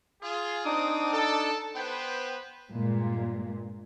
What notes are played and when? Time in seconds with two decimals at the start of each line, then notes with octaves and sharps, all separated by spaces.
0.22 F4 G#4
0.65 C4 D4 D#4 D6 D#6
1.13 A4
1.76 B3 B4 C5 G5
2.72 G2 A#2 G#3